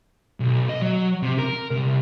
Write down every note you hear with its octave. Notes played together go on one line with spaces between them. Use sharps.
B1
D#5
F#3
C3
A#4
C2